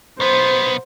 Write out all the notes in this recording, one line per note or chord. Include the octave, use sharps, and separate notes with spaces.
B1 B3 C5